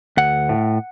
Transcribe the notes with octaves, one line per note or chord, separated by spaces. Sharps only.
D2 F#5
A2